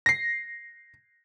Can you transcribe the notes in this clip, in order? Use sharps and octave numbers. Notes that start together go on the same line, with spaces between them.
A#6 C7